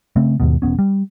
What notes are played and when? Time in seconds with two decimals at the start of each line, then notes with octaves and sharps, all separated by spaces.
0.16 C#3 A3 C4
0.40 D#2 G#2 B2
0.62 E1 G2 B3 C#4
0.79 G3